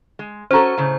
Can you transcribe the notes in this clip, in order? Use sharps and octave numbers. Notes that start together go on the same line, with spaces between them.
G#3
C#4 F#4 A4 C5 A#5
A2 C#3